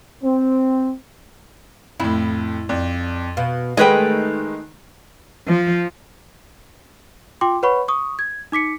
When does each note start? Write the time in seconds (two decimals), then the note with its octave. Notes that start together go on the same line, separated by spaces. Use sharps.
0.24 C4
2.00 F2 A2 E4
2.69 F2 D5
3.37 B2 F5
3.77 D#3 G#3 A3 D#4 G#4 B4 D#5 G5
5.48 F3
7.41 F4 G5 C6 D6
7.63 B4 C#5 F#5 B5 C#6
7.88 C#6 D#6
8.19 G#6
8.52 D#4 D6 B6 C#7